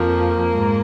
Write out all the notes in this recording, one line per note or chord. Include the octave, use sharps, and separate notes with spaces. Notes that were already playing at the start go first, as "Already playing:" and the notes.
Already playing: F2 F3 A#3
G#2